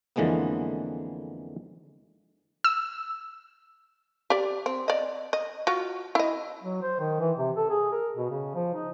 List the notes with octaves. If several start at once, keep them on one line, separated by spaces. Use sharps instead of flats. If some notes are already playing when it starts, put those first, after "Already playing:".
F2 D3 E3 G#3 A#3 B3
E6
G4 D5
C4
D5 D#5
D#5
F4 F#4
E4 D#5
F#3
C5
D#3
E3
C3
A4
G#4
A#4
B2
C#3
F3
D#4